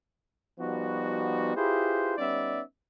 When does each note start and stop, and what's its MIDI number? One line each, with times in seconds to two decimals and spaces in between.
0.60 1.56 53
0.60 1.56 55
0.60 1.56 59
0.60 1.56 63
0.60 1.56 66
1.56 2.14 64
1.56 2.14 65
1.56 2.14 67
1.56 2.14 68
1.56 2.14 71
1.56 2.14 72
2.17 2.61 55
2.17 2.61 59
2.17 2.61 61
2.17 2.61 63
2.17 2.61 74
2.17 2.61 76